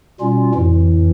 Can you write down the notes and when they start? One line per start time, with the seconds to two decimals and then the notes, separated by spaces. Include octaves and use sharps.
0.21 B2 G3 C#4 F4
0.55 F2 A2 E3